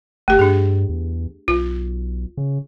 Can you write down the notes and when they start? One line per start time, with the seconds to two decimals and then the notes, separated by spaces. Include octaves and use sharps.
0.28 G1 A3 G4
0.39 G2 D4 G#4
0.89 E2
1.48 B1 F4
2.37 C#3